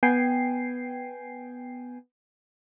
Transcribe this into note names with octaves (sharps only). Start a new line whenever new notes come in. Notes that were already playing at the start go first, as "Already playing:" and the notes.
B3 G5 G#5 C7